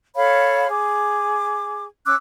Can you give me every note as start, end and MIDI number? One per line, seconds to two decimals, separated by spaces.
0.16 0.68 69
0.16 0.68 73
0.16 0.68 77
0.16 0.68 83
0.69 1.84 68
0.69 1.84 86
2.05 2.15 61
2.05 2.15 86
2.05 2.15 88
2.05 2.15 90